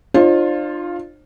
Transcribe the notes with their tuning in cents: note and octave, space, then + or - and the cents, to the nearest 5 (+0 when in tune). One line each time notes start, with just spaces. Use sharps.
D4 +45 F4 +0 C5 +35